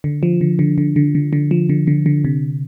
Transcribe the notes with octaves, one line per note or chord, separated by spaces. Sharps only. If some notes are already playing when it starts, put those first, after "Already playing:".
D3
F3
D3
D3
D3
D3
D3
D3
F3
D3
D3
D3
C3